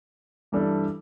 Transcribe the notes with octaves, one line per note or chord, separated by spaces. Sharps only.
G2 E3 G3 D4 A4